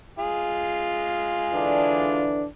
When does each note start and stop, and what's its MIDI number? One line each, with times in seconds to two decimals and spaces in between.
0.19 2.27 56
0.19 2.27 65
0.19 2.27 68
1.54 2.45 50
1.54 2.45 52
1.54 2.45 62